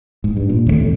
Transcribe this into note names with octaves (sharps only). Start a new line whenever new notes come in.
G#2
G2
A#2
D#2 E3 A3
E2 G#2 C3